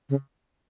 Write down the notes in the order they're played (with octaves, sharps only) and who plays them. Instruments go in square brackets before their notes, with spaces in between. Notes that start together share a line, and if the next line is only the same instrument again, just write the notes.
[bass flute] C#3